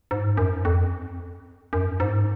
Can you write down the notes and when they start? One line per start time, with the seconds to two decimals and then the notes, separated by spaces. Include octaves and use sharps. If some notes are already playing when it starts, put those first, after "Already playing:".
0.11 G#2
0.37 F#2
0.65 F2
1.73 F#2
2.00 G#2